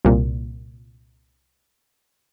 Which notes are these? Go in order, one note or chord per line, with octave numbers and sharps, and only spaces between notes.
C2 A#2